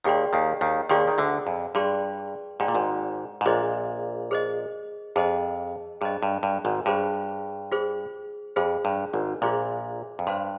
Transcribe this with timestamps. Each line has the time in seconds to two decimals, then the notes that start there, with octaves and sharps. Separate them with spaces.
0.04 D#2 D#3 F4 G#4 D5 G5 C6
0.33 D#2 D#3
0.61 D#2 D#3
0.89 D#2 D#3 F4 G#4 D5 G5 C6
1.08 D#3
1.18 D2 D3
1.47 F2
1.75 G2 F4 G#4 D5 G5 C6
2.60 G#2 F4 G#4 D5 G5 C6
2.68 A#2
2.75 G#1 G#2
3.41 G#2
3.46 A#1 A#2 G#4 C5 D#5
4.31 G#4 C5 D#5
5.16 F2 G#4 C5 D#5
6.01 G2 G#4 C5 D#5
6.23 G2
6.43 G2
6.65 G#1 G#2
6.86 G2 F4 G#4 C5
7.72 F4 G#4 C5
8.56 F2 F4 G#4 C5
8.85 G2
9.14 G#1 G#2
9.42 A#1 A#2 F4 G#4 C5
10.19 F2
10.27 G2 C5 F5 C6